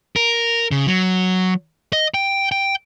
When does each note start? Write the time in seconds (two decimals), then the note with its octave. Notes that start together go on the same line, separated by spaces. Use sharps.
0.16 A#4
0.71 C#3
0.87 F#3
1.93 D#5
2.14 G5
2.52 G5